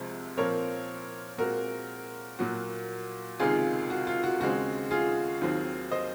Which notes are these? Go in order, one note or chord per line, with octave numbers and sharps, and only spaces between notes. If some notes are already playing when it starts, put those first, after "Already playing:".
Already playing: C2 C3 F3 G#3 C4
A#2 F3 C4 A#4 C#5
A#2 G#3 C4 F#4 A#4
A#2 F#3 A#3 F#4
C#2 C3 D#3 G#3 F4 G#4
F#4
F4
F#4
D#2 C#3 G#3 C4 F#4
F4 G#4
D#2 D#3 F#3 C4
C5 D#5